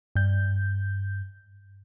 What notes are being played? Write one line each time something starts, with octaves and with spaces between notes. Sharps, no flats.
G2 G6